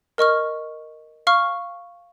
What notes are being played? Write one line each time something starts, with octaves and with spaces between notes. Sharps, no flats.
A#4 D#5 C#6 F6
F5 C#6 F6